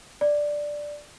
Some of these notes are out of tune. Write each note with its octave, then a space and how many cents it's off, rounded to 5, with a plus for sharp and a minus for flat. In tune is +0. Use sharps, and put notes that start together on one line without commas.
D5 +5